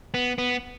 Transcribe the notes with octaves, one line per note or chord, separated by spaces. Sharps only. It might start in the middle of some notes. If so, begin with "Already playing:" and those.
B3
B3